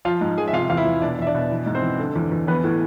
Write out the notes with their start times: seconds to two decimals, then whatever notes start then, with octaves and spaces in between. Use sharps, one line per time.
0.05 F3 F4 F5
0.21 G#2
0.37 F3 G#4 G#5
0.48 E5
0.53 C3 F4 F5
0.70 E2 F5
0.77 E4 E5
0.86 E2
1.02 B2 D4 D5
1.19 E2 E5
1.27 D4 D5
1.35 B2
1.51 E3
1.66 G#2
1.75 C4 C5
1.82 E3
1.99 D3
2.16 E2
2.32 E2
2.47 E3 B3 B4
2.64 A2